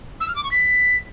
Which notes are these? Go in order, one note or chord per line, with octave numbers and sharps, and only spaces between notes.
E6
F6
D6
C#6
B6